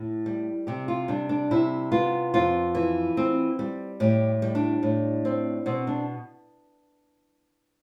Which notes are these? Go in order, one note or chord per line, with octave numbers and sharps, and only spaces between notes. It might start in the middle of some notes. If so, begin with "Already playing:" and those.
Already playing: A2
G3
C3 G4
F4
G3 D4
D4
C3 E4
B3 F4
F2 F4
E3
C4
G3
A2 G4
G3
D4
A2
C4
B2 C4
D4